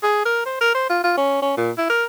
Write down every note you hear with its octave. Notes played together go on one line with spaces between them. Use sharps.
G#4
A#4
C5
A#4
C5
F4
F4
C#4
C#4
A#2
E4
A#4